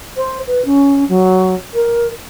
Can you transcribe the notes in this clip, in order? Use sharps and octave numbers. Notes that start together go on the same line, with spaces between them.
C5
B4
C#4
F#3
A#4